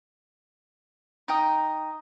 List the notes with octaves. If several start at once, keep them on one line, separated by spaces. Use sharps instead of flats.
D#4 D#5 G5 D#6